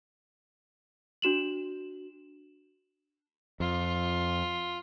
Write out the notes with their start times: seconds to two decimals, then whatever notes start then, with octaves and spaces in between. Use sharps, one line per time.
1.22 D4 F#4 E7 F#7
3.60 F2 F4